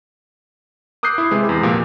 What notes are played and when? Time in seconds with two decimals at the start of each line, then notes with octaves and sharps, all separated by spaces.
1.03 D6 D#6 F#6 G6 C7
1.18 E4
1.31 C3 G#3 B4
1.49 E2
1.63 A#2 F3 G4